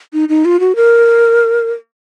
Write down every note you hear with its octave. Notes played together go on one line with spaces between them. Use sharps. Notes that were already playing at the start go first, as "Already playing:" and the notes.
D#4
D#4
F4
F#4
A#4